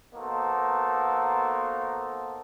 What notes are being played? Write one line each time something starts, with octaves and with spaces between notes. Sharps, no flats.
A#3 B3 D#4 F#4 A4 C5